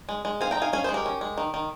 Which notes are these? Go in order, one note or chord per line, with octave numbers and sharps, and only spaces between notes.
G#3
G#3
C4 F5 G#5
G5 A#5
D#4 F5 G#5
C#4 F5 G#5
G#4 C5
G#3
G4 A#4
C#4
G#3
D#3
D#3